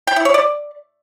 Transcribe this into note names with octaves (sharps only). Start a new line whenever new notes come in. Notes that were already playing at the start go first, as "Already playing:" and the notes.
G5
E4
C#5
D5